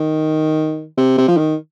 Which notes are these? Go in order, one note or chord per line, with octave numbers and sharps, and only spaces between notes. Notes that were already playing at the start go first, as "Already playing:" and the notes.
Already playing: D#3
C3
C3
F3
D#3